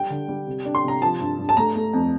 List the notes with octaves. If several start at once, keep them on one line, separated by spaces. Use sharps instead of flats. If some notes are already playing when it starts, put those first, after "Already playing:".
Already playing: G3 G5
D3
G3
C3
D4
C6
C3 A#5
F3 A5
G2
G2
A5
A3 A#5
A3
F2